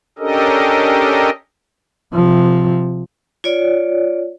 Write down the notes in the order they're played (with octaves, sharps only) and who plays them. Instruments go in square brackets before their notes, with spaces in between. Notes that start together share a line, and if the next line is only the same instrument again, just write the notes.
[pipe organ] C#4 D4 G4 A4 A#4 D#5
[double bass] C3 F3
[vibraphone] F4 C#5 D5